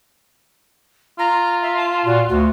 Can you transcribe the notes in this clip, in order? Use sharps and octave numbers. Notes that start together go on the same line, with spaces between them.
F4 A#5
E5
A5
A#2 F#4
D2 F#4